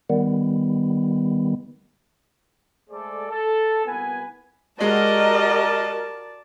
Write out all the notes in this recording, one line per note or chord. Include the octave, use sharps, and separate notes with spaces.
D#3 G3 B3
G#3 A3 G#4 A4 C5 D5
A4
C2 A#2 B3 B4 G#5
G#3 F#4 G4 A#4 D5 D#5 A5